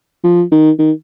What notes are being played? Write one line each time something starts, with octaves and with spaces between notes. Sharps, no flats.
F3
D#3
D#3